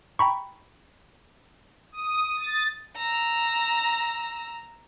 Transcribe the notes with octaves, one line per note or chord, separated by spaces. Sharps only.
G5 A#5 B5 C#6
D#6
A6
A#5 E6